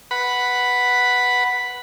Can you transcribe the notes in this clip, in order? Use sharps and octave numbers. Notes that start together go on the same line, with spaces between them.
B4 F#5 B5